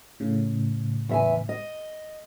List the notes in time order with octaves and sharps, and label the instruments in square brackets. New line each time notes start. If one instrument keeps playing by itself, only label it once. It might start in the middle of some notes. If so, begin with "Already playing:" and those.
[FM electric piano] A2 C#3
[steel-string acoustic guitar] E2 E5 G#5
D#5